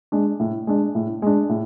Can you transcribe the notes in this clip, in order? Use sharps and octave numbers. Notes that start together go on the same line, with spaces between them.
G#3 D4
A2
G#3 D4
A2
G#3 D4
A2